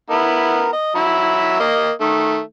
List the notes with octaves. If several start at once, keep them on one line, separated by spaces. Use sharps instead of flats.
B3 E4 A#4
D#5
F#3 E5 B5
A#3 D#5
D#3 A3